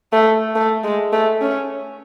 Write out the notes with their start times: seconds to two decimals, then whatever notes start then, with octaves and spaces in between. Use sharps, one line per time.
0.13 A3
0.55 A3
0.84 G#3
1.13 A3
1.41 C#4